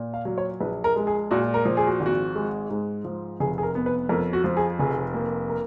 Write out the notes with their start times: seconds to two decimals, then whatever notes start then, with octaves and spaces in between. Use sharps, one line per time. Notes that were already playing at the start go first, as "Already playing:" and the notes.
Already playing: A#2
0.14 F5
0.25 F#3
0.38 C#5
0.61 A#1 B4
0.84 A#4
0.96 G#3
1.07 G#4
1.31 A#2 F#4
1.54 A#4
1.65 F3
1.77 G#4
1.87 F#4
2.00 G#1
2.06 F#4
2.35 G#3
2.70 G#2
3.05 F3
3.40 F1 G#4
3.58 G#4
3.63 A#4
3.75 B3
3.86 B4
4.09 F2 A#4
4.33 F#4
4.44 F3
4.57 G#4
4.79 F1 G#4
5.14 A#3
5.50 A#4